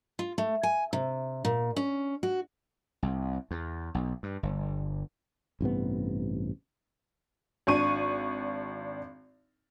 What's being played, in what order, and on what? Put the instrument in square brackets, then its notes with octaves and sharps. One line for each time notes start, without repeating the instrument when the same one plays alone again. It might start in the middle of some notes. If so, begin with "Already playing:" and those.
[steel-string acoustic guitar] F4
A3
G#5
C3
A#2
C#4
F#4
[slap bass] C2
E2
B1
G2
G1
[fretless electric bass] A1 G2 C3 B3
[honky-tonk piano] G#1 D4 C#6 D#7